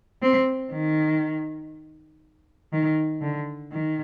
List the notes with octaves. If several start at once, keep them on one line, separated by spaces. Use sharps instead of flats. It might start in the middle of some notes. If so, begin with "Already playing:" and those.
C4
D#3
D#3
D3
D#3